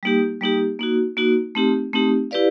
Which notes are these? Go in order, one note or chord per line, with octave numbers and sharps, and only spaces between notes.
G3 A#3 D#4 G4
G3 A#3 D#4 G4
A#3 D#4 F#4
A#3 D#4 F#4
A3 C4 D#4 G4
A3 C4 D#4 G4
E4 G4 B4 D5 F5